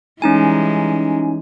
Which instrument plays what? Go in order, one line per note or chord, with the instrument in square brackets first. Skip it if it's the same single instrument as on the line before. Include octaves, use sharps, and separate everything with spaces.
[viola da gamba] E3 G3 G#3 [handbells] C#4 D#4 G#5